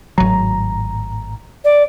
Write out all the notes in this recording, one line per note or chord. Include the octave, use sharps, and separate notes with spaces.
G#1 A2 F#3 A#5
D5